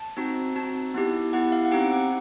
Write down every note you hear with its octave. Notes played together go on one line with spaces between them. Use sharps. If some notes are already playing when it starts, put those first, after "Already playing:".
Already playing: A5
C4 D#4 F#4
C4 D#4 F#4 A5
B3 E4 G4
B3 E4 G4 F#5
F5
F#5
C4 D#4 G4 G5
F#5